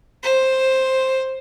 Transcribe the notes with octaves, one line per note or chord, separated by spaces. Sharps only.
C5